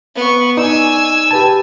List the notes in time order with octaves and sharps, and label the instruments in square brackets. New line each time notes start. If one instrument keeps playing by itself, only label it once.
[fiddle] B3 C#6
[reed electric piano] D#4 D5 [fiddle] G#5 E6
[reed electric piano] G4 B4 A5